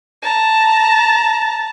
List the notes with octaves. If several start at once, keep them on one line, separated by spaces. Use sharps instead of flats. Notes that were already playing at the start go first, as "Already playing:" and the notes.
A5 A#5